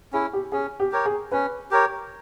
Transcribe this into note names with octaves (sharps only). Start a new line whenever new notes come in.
C#4 E4 G#4
G4
C#4 G#4
G4
G4 A#4 C#5
G#4
C#4 B4
G4 A#4 C#5